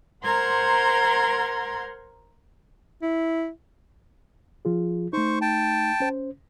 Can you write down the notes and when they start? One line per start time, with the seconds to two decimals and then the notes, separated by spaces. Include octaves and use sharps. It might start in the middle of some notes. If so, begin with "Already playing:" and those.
0.24 A#4 C5 F#5 A#5 C6 G#6
3.02 E4
4.65 F3 F4 G#4
5.13 A3 D#4 C5 C#6
5.41 G5 A5
6.00 C#4 C5